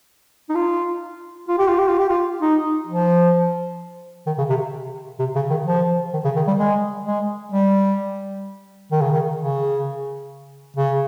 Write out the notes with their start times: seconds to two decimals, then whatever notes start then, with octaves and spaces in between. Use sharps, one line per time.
0.49 D#4
0.56 F4
1.49 F4
1.58 G4
1.68 F4
1.79 G4
1.89 F4
1.99 G4
2.09 F4
2.42 D#4
2.88 F3
4.27 D#3
4.38 C#3
4.50 C3
5.20 C3
5.36 C#3
5.50 D#3
5.67 F3
6.13 D#3
6.25 C#3
6.36 D#3
6.47 G3
6.59 G#3
7.06 G#3
7.52 G3
8.92 D#3
9.02 C#3
9.12 D#3
9.38 C#3
10.77 C#3